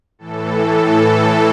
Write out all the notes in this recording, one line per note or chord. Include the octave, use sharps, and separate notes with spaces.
A2 E3 A4
A4
A2 E3